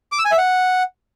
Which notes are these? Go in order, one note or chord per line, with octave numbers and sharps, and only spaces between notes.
D6
E6
G#5
E5
F#5